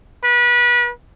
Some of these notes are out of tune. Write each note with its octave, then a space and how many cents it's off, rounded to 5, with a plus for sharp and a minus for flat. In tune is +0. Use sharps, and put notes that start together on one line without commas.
B4 -30